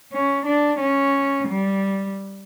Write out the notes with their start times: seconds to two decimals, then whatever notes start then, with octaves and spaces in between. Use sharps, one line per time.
0.12 C#4
0.46 D4
0.80 C#4
1.48 G3